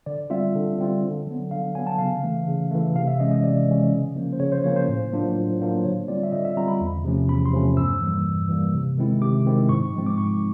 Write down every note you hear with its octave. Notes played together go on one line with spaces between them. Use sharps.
D3 D5
G3 C4 F4 E5
D3
G3 C4 F4
D3
F#3 B3
D3 F5
F#3 B3 G#5
A5
C#3 F5
E3 A3
C#3
E3 A3
C3 F5
E5
E3 G#3 C#4 D#5
D#5
C3 D5
E3 G#3 C#4
C#3
F3 A#3 C#4
C5
C#3 C#5
C5
F3 A#3 C#4 C#5
C5
A2
F#3 A#3 D4 F4
A2
F#3 A#3 D4 F4
D3 C#5
G3 C4 F4 D5
E5
D3 D#5
E5
G3 C4 F4 A#5
B5
E2
C3 F3 A3 C#4
E2 B5
C6
C3 F3 A3 C#4
G2 E6
E3 G3 A#3
G2
E3 G3 A#3
C3
D#3 G#3 C4 E4
C3 D6
D#3 G#3 C4 E4
G#2 C#6
F3 G#3 C4
D6
G#2 C#6